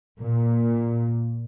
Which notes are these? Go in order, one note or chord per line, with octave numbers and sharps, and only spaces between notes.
A#2